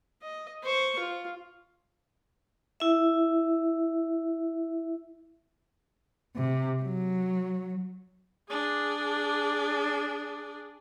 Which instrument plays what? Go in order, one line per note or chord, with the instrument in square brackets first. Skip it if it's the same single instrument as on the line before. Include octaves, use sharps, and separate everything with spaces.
[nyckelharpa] D#5
C5 C#6
F4
[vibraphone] E4 E5
[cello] C3
F#3
[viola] D4 G#4